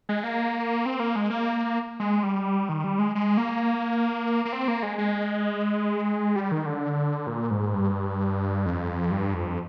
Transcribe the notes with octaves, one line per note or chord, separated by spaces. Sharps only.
G#3
A#3
C4
A#3
G#3
A#3
G#3
G3
D#3
G3
G#3
G#3
A#3
A#3
C4
A#3
G#3
G#3
G3
D#3
D3
A#2
G#2
G2
F2
G2
F2